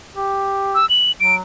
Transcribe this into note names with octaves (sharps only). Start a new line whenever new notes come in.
G4
E6
F#7
F#3 D7